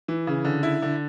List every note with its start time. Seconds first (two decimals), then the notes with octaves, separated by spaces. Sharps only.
0.08 E3
0.27 C#3
0.45 D3
0.63 E4
0.82 D3